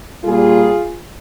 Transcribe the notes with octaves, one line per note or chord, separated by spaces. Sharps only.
A#2 G3 F4 G#4